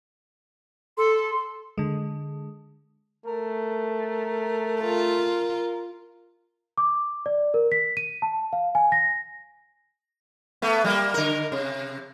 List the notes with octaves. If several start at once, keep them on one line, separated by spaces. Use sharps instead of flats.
A4 C6
D3 G#3
A3 A#4
F4 A#4
D6
D5
A#4
B6
D#7
A5
F5
G#5
A#6
A3 B3
G3 A#3
D3 A#4
C3